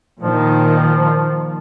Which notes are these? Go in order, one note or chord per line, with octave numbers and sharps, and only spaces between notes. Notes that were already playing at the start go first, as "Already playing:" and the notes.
A#2 D#3 F3